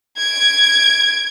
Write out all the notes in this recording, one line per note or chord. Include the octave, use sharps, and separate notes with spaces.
G#6 D7